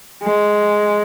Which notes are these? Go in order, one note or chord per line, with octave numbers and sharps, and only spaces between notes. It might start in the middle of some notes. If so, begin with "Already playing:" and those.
G#3